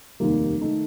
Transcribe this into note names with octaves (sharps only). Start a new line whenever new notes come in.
F1 D#2 D#3 G3 A#3
D#3 A3 D#4 A4